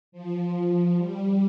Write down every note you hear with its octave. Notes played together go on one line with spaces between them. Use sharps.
F3
G3